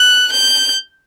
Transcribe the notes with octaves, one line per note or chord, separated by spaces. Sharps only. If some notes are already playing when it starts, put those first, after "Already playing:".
Already playing: F#6
G6